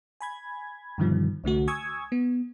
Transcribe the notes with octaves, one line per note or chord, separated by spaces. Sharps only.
G#5 B5 G#6
G2 B2 D3 D#3 F3 G3
C2 D3 A3 F#4
G#5 C#6 D#6 E6 G#6
B3